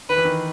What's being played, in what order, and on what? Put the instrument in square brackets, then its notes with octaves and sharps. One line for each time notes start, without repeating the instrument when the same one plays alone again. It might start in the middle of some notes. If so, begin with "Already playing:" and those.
[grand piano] D#3 [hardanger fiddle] B4
[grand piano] E3
D#3